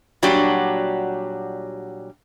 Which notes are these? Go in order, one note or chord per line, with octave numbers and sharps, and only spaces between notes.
A#2 F#3 G3 D4 F#4 G4